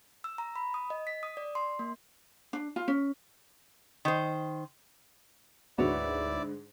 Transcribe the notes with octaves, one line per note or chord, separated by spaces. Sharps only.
E6
A#5
B5
D#6
D#5
B6
D#6
D5
C6
A#3
D4
F4
C#4
D#3 C5
D2 G#2 D3 E4 F#4 B4 C#5 D5